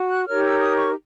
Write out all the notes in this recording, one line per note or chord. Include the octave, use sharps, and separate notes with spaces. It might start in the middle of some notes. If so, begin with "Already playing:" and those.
Already playing: F#4
F#6
D#4 G4 A#4 C#5 F6
E6
D#6
C#6